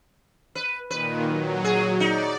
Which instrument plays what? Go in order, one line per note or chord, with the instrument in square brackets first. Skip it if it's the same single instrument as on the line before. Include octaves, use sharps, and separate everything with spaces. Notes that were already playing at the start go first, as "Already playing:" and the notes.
[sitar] B4
[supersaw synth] A#2 D#3 [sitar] B4
[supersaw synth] F#3
[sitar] G#4
[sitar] D#4 [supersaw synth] D5